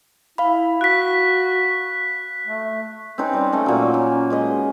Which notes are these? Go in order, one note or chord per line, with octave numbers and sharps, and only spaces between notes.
E4 F5 B5
F#4 F#6 B6
A3
C4 C#4 D#4 B4
G3
A3 C#4 D#5
A#2 F#3
C#4
G#3 B4 D#5